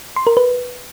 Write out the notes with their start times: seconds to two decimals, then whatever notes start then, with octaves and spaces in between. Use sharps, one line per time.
0.16 C6
0.27 A#4
0.37 B4